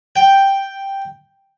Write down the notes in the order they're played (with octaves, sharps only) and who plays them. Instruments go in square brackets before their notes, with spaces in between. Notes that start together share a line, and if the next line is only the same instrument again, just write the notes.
[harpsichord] G5